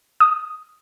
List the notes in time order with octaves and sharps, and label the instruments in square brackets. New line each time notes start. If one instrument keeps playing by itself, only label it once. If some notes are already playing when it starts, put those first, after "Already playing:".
[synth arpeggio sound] D#6